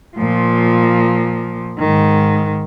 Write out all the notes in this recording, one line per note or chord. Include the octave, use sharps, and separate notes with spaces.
A#2 F3
G#2 D#3